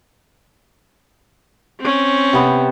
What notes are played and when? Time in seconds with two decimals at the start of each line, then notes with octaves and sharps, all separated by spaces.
1.80 C4 C#4
2.33 C3 B3 C5